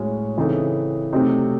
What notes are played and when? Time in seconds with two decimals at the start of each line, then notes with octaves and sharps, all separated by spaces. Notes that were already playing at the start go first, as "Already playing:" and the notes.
Already playing: A2 G#3 C#4 F#4
0.37 C#3 E3 C4 D#4 A4
1.13 C3 F#3 A3 C4 D#4